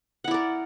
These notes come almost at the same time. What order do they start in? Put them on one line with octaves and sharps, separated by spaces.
F#5 E4 D5 A#4